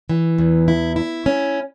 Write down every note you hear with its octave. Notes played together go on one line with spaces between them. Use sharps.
E3
E2
E4
E4
C#4